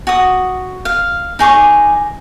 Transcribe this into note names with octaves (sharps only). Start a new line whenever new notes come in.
F#4 D#6
F5
D#4 G#4 C#6 D6